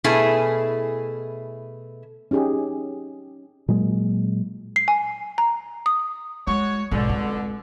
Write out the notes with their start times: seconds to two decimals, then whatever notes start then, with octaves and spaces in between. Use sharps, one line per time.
0.04 B2 A3 E4 G#4 G#5
2.31 C#4 D#4 G4 G#4
3.68 A#2 F#3 G#3
4.76 C7
4.88 G#5
5.38 A#5
5.86 D#6
6.47 G#3 F#4 C#5
6.91 B1 F2 G#2 B2 D3
7.09 G#3